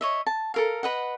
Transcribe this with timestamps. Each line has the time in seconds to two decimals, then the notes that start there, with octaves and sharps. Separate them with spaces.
0.01 C#5 D#5 E5
0.27 A5
0.54 A4 A#4 F5
0.83 B4 D#5 F#5